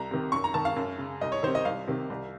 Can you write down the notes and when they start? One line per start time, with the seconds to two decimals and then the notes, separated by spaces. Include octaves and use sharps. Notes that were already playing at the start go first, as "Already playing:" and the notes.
Already playing: C2 A#5
0.11 C3 D#3
0.32 F#2 C#6
0.44 A#5
0.54 D#3 A5
0.65 F5
0.76 F#2
0.98 C#3
1.21 C2 D#5
1.32 C#5
1.43 C3 D#3 C5
1.55 D#5
1.65 C2 F5
1.88 C3 D#3
2.10 C2